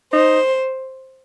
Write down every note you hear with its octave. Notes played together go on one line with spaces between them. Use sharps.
D#4 C5